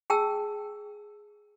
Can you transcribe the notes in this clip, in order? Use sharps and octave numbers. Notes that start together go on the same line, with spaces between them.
G#4 G5 A5 E6